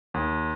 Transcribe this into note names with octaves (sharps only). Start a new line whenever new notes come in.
D#2